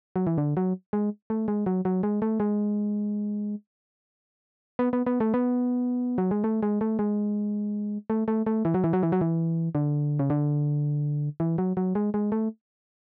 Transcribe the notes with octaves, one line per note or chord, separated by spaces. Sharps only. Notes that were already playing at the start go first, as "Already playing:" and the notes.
F#3
E3
D3
F#3
G#3
A3
G#3
F#3
F#3
G#3
A3
G#3
B3
B3
B3
A3
B3
F#3
G#3
A3
G#3
A3
G#3
A3
A3
A3
E3
F#3
E3
F#3
E3
F#3
E3
D3
C#3
D3
E3
F#3
F#3
G#3
G#3
A3